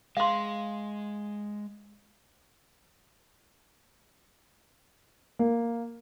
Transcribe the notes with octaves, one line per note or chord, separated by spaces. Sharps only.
G#3 F5 C6
A#3